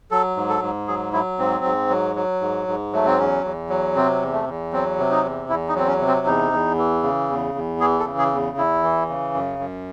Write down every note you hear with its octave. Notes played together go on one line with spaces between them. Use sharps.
F#3 A4
G#2
A4
G#2
F#3 G#4
F#3 E4
G#2 C4
G#2
F#3
F#3
G#2
G#2
F#3 A3
C4
E2 C#4
E2
F#3
C3 C4
E2
A3
E2
F#3 C4
C3
D#4
E2
E2 E4
D#4
F#3 C4
C#4
C3
C4
E2 D#4
E2
E3
C#3
E2
E2
E3 G#4
A4
C#3
G#4
E2
E2 E4
E3
C#3
F#2
F#2